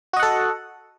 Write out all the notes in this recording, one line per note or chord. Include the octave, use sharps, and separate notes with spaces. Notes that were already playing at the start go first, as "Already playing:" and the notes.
F#4 A4 D#5 F#5